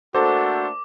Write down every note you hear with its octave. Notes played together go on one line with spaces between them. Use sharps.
A3 A#3 D4 F#4 A4 C5 D6